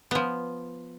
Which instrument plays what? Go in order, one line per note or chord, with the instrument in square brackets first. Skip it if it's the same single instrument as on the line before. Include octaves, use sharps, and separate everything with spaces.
[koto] F3 B3